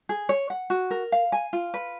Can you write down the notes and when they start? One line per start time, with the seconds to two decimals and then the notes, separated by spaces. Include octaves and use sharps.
0.09 G#4
0.29 C#5
0.50 F#5
0.70 F#4
0.91 A#4
1.12 F5
1.32 G#5
1.53 F4
1.74 B4